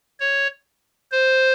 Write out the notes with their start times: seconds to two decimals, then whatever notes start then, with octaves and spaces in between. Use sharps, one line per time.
0.20 C#5
1.12 C5